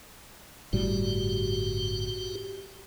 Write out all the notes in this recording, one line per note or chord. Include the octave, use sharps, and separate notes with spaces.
G1 A2 G3 F#4 G4